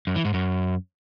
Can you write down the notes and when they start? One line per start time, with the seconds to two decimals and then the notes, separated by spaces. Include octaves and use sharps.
0.07 F#2
0.16 E3
0.25 G#2
0.34 F#2